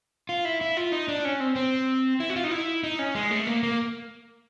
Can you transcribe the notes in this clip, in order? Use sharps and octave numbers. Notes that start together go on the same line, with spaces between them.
F4
E4
E4
F4
D#4
D4
C#4
C4
C4
E4
F#4
F4
D#4
E4
D#4
C#4
G#3
A3
A#3
A#3